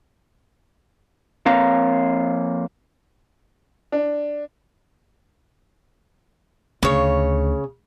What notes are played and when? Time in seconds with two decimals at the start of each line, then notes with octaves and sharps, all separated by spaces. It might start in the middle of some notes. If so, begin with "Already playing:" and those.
1.46 F2 A#3 C4 C#5 F5 A#5
3.92 D4
6.83 D2 C#3 C#5